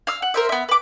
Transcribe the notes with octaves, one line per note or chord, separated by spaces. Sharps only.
F5 E6
F#5
A#4 C5 E5
B3 E5
B4 D6